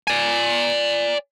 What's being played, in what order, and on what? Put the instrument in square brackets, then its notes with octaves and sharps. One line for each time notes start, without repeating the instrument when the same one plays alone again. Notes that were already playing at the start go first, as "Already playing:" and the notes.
[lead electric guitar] D5 G#5